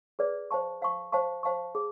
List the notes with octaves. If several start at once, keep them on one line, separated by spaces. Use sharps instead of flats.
G#4 B4 D5
C5 F5 A5 C#6
C5 F5 A5 C#6
C5 F5 A5 C#6
C5 F5 A5 C#6
G#4